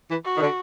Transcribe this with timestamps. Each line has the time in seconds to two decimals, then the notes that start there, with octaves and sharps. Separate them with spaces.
0.09 E3
0.25 F#4
0.35 D#3
0.41 D3